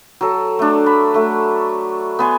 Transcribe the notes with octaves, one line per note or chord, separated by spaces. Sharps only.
F#3 A4
A3 D4
B5
A3 F#4
B3 G#5 C6